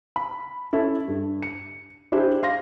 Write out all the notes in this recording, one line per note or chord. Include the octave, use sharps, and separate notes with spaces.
B5
C#4 E4 A4
G2
C#7
D4 E4 G4 G#4 C5
F5 C6 A#6